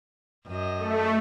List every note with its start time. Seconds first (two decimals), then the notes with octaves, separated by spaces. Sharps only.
0.47 F#2 D#5
0.78 A3